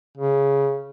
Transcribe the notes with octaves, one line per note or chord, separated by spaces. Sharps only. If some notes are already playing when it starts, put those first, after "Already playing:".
C#3